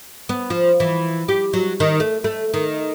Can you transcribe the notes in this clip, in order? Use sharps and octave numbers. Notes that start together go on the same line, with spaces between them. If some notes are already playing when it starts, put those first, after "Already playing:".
B3
F3
E3
G4
F#3
D#3
A3
A3
D#3